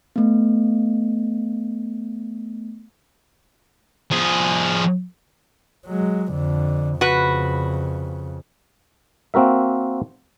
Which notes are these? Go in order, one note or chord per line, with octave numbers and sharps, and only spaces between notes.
A3 B3
F3 G#4
F#3 G#3
F2 D3
F2 C#3 F#4 B4
A#3 C4 F#4 A#4 E5